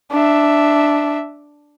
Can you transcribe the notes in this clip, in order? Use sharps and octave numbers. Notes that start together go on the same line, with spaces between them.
D4 E5